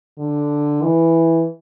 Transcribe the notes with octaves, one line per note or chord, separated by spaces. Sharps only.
D3
E3